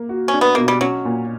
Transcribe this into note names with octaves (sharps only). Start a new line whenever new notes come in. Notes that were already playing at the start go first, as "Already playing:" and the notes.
Already playing: A#3
F#4
C#4
D4
B3
B2 A#3
G3
F#3 C#4
A#2